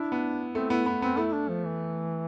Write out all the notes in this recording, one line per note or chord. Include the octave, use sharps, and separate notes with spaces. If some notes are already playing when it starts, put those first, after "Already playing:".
Already playing: D4 E4
B3
A3 C4
B3 E4
B3
B3 C4
A3 E4
D4
F3
E3